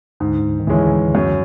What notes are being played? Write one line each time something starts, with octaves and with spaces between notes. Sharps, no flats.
D2 G#2 D3
D#3
D2 D3 E3 G#3 C#4 E4
F#2